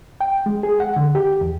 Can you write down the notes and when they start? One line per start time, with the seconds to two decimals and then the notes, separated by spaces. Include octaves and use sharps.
0.21 G5
0.46 G#3
0.63 G#4
0.80 F#5
0.96 D3
1.15 G4
1.41 E2